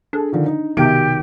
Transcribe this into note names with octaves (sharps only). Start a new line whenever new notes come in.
D4 G#4 A4
D3 D#3 F3
D#4
B1 C3 D#3 G4 D7